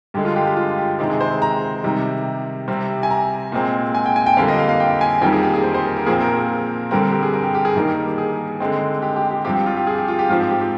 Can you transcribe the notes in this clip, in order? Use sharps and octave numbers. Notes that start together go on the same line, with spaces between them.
G2 D3 G#3 G4
F4
G4
G4
F4
G4
C3 D#3 G#3 C4 G4
G#4
C5
A#5
C3 D#3 G3
C3 G3 C4
G#5
A#5
A#2 G#3 C4
G#5
G5
G#5
G5
F2 D3 G3 A#3 F5
D#5
F5
F5
G5
G#5
F2 D#3 G3 A#3 G5
G#4
G4
G#4
C5
C5
A#4
A#4
A#2 F3 C4 G#4
A#4
G2 D3 G3 C4 A#4
A#4
G4
G#4
A#4
G4
G4
G#4
G2 D#3 G3 A#3 A#4
G#4
D3 G#3 C4
G4
G4
G4
G2 F3 C4 G4
G4
F4
G4
G#4
G4
F4
G4
G#2 F3 C4 F4
G4
G4
G4